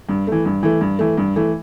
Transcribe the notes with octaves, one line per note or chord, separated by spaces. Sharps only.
G2
E3 A3
G2
E3 A3
G2
E3 A3
G2
E3 A3